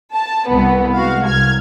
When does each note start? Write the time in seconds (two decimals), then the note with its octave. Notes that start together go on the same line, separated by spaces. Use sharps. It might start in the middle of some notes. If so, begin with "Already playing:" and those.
0.15 A5
0.50 C2 B3
0.96 G#3 F#4 F5
1.27 C2 F6 G#6